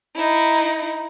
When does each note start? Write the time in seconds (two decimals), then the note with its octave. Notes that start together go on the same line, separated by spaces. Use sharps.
0.15 D#4 E4